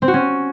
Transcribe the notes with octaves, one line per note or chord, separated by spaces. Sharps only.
C4
F#4
C#4